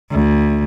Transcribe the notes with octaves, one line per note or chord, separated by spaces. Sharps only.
D2